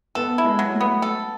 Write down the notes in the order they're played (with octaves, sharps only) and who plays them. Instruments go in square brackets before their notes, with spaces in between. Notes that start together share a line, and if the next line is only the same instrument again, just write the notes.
[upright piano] B3 [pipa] A4
[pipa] E4
[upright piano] G#3
[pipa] F#3
[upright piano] A3
[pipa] B3
A4